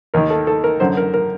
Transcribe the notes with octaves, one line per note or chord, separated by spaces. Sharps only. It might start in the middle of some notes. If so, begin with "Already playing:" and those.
D#2 D#3 A#4
A4
A4
A#4
F#2 D3 C5
A#4
A#4